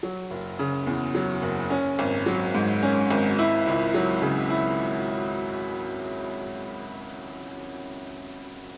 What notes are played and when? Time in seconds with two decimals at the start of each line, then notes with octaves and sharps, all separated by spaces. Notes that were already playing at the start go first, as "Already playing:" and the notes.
0.03 F#3
0.31 F#1
0.59 C#3
0.87 E2
1.15 F#3
1.43 F#1
1.70 C#4
1.99 G#1
2.26 F#3
2.55 G#2
2.83 C#4
3.11 G#1
3.39 E4
3.67 C#2
3.94 F#3
4.22 C#3
4.50 E4